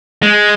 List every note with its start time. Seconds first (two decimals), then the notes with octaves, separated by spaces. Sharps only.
0.23 G#3